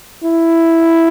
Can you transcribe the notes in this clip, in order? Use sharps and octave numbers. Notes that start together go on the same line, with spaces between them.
E4